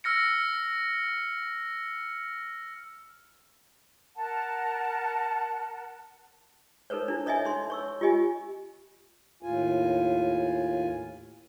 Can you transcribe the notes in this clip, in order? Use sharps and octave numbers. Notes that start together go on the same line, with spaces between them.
E6 F6 A#6 C#7
A#4 F#5 A5
D#4 A4 A#4 C5 C#5
D4 E4
A4 C#5 D#5 E5 G#5
D#4 C6
C#5 C#6 E6
F4 G4 D#5 G#5
D#2 A2 F4 G#5